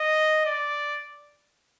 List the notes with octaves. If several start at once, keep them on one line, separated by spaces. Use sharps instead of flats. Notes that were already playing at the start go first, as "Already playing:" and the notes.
Already playing: D#5
D5